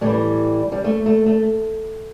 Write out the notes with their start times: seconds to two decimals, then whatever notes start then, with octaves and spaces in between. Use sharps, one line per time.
0.01 A2 E3 G3
0.72 G3
0.84 A3
1.06 A3
1.26 A3